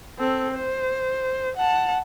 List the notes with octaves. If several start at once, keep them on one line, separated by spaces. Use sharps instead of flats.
C4 A4
C5
F#5 A5